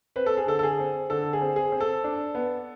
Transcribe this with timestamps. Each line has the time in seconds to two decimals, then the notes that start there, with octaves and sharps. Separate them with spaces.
0.16 C4 B4
0.26 A4
0.37 G#4
0.47 D3 A4
0.59 A4
0.63 G#4
0.79 C4
1.10 D3 A4
1.33 G#4
1.41 C4
1.56 G#4
1.72 C4
1.80 A4
2.04 D4
2.35 B3